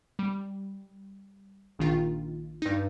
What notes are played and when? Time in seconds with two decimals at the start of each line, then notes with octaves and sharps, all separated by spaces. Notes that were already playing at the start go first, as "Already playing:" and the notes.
0.19 G3
1.79 A#1 D#3 F4
2.62 G2 D#4